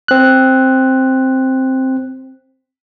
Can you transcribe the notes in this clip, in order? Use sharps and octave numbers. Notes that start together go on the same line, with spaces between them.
C4 F#6